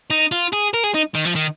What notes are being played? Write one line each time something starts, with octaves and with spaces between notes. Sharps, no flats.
D#4
F4
G#4
A#4
G#4
D#4
D#3
F3
D#3